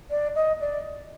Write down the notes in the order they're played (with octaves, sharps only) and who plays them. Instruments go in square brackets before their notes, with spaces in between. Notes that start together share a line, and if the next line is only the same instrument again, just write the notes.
[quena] D5
D#5
D5